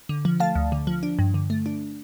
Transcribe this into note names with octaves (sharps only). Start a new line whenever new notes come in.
D3
F3
A3 F5 A5
D2
D3
F3
D4
G2
D3
A3
D4